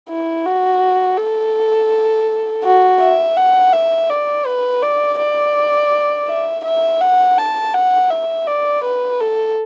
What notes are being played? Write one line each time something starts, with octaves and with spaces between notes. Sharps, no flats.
E4
F#4
A4
F#4
E5
F#5
E5
D5
B4
D5
D5
E5
E5
F#5
A5
F#5
E5
D5
B4
A4